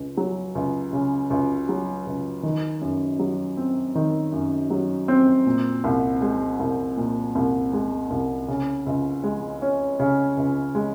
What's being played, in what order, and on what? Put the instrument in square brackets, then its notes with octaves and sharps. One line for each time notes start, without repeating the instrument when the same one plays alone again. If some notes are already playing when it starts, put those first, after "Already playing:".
Already playing: [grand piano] C#2
F#3
C#2
C#3
C#2
F#3
C#2
D#3
F#2
F#3
C4
D#3
F#2
F#3
C4
A#2
C2
G#3
C2
A#2
C2
G#3
C2
C#3
C#2
G#3
C#4
C#3
C#2
G#3